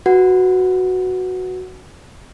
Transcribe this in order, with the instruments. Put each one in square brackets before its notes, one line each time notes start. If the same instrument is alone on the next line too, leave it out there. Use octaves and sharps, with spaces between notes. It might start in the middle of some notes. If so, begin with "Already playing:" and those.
[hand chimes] F#4 B4 F#5